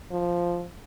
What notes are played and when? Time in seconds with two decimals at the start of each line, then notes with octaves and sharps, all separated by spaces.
0.12 F3